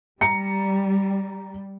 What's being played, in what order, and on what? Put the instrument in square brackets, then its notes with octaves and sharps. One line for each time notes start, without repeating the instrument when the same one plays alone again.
[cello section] G3 [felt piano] A#5 C#7